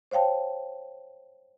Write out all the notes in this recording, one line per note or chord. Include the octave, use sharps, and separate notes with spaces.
C5 C#5 F5 G5 A5